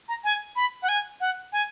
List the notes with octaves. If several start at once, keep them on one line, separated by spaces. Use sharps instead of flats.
A#5
G#5
B5
F#5
G#5
F#5
G#5